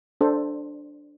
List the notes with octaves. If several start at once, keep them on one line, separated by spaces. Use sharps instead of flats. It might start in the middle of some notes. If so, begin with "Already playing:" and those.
D4 A4 C5